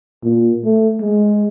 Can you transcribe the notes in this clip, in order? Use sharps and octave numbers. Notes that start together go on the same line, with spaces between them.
A#2
A3
G#3